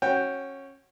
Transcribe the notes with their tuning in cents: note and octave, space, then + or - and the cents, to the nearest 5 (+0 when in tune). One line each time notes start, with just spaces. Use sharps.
C#4 -20 F#4 +0 G5 +0